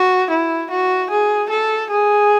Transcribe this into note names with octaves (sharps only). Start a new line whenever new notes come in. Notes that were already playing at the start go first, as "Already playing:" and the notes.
Already playing: F#4
E4
F#4
G#4
A4
G#4